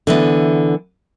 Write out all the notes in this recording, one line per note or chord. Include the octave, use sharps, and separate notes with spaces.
D3 E3 B3